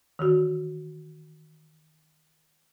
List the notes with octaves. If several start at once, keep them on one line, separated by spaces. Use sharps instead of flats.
D#3 E3 F#4